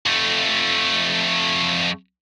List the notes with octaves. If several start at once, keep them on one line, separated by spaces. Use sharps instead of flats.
F2 A3